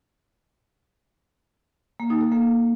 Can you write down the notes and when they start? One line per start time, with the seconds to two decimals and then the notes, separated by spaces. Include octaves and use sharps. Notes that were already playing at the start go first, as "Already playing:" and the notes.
2.00 A#3
2.10 D#4
2.21 A4
2.32 A#3